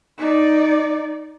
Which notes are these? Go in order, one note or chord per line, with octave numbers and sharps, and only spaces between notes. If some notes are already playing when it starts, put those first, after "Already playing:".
D#4 D5